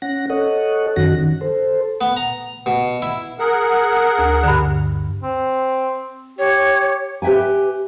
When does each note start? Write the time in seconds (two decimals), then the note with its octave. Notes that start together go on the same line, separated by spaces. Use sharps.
0.02 C#4 F#5 A#6
0.30 A4 C#5 D#5 F#5
0.96 F#2 D#3 C#4 F#4 F#5 A#6
1.19 D#3
1.41 A4 C5
2.01 B3
2.17 A#5
2.66 B2
3.02 E4
3.39 G#4 A#4 F#5
4.19 D2
4.43 G2 D3
5.23 C4
6.39 G4 C#5
7.22 G4 B4 E5 G5 G#5